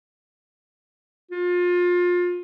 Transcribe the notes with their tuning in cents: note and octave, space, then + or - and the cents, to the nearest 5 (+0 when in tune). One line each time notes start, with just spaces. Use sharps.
F4 +25